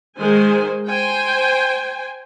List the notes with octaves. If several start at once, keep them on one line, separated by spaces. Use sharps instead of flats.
D#3 G#3 C5 G#5
C5 G5 G#5